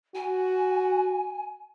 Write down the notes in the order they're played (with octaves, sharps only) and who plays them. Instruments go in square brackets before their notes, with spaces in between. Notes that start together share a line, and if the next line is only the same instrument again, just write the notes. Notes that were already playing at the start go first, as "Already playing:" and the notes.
[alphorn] F#4 [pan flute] G#5